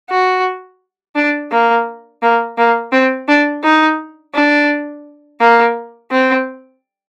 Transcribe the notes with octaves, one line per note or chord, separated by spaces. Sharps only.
F#4
D4
A#3
A#3
A#3
C4
D4
D#4
D4
A#3
C4